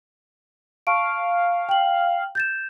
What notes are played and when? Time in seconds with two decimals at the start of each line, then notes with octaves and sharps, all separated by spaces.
0.87 F5 A5 C#6 D7
1.69 G5 F#7
2.35 G6 A6 E7